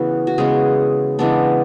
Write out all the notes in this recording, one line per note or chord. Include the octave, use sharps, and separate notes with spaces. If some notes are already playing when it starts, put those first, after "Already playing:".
Already playing: C#3 E3 B3 F#4
F#4
C#3 G#3 B3 G#4
C#3 E3 G#3 B3 D4